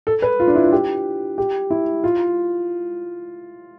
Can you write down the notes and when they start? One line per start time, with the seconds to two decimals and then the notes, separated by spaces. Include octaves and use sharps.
0.07 A4
0.22 B4
0.40 F4
0.48 D4
0.55 E4
0.64 F4
0.72 G4
1.38 G4
1.70 E4
2.04 F4